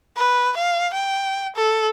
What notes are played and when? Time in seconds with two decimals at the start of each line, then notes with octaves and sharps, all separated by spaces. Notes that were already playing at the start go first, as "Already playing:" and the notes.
0.17 B4
0.57 F5
0.94 G5
1.56 A4